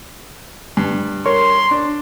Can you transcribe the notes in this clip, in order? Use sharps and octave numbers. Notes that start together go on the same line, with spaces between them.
G2
A#4 C#5 C6 C#6
D4